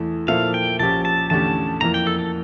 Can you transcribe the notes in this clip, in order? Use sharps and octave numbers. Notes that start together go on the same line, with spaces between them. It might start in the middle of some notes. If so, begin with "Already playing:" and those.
Already playing: E2 E3 A3
A#2 F3 A#3 E4 A4 F5
G5
A#1 A#2 F3 C#4 G4 A5
A5
E2 D3 A3 C#4 G4 A5
F2 E3 A#3 A#5
G5
A4
A4